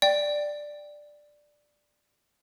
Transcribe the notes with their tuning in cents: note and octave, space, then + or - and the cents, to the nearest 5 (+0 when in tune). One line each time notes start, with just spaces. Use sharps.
D5 +5 G5 +0